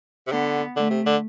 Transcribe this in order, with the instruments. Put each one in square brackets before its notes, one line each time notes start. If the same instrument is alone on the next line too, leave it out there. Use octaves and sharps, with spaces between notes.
[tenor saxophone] C3
[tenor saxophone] D3 [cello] B3
[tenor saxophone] D3 [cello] A3
[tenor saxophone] C3
D3